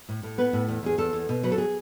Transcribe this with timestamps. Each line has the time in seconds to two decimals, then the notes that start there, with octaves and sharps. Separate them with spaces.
0.09 A2
0.23 A2
0.38 B3 B4
0.53 A2
0.68 E2
0.83 E2 G#4
0.98 E2 A4
1.13 E2
1.29 B2
1.43 F#3 B4
1.52 A4
1.58 G#4